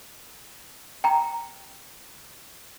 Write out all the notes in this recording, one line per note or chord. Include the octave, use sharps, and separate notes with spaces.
G5 A#5